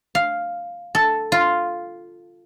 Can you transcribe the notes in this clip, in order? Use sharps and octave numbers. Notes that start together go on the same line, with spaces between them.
F5
A4
F4